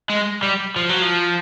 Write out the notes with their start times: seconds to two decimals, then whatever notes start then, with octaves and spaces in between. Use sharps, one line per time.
0.10 G#3
0.43 G3
0.76 F3
0.89 F#3
1.02 F3